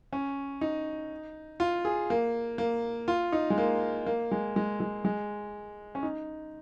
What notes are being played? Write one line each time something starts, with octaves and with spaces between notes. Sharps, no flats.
C#4
D#4
F4
G#4
A#3
A#3
F4
D#4
G#3
A#3
A#3
G#3
G#3
G#3
G#3
C#4
D#4